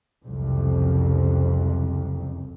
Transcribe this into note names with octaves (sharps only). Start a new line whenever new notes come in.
F#1 C2 F2